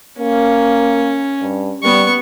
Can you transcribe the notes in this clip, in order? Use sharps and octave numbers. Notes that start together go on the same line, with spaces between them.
A#3 C#4
G2
G3 B3 C#6